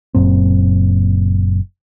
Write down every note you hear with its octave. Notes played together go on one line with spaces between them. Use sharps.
F#1 F#2 A#2 C4